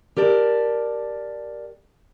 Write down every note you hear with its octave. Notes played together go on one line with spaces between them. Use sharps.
G4 A#4 D5 A5